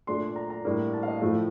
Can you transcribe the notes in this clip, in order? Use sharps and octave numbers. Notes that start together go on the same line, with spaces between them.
A#2 A3 D4 C6
A#5
A#5
A2 G3 A#3 D4
A5
F5
D#5
A2 F3 A3